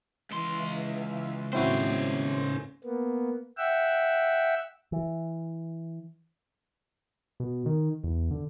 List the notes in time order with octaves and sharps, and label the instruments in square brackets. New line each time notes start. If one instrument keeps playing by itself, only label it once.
[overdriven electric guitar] C#2 C6 [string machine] E3 E5 F5
[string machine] D#2 A2 [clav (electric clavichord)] C4 E4 F#4 [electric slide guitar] C#4 C5
[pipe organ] A#3 B3
E5 F#5 G5 E6
[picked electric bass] E3
[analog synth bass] B2
D#3
E2
D3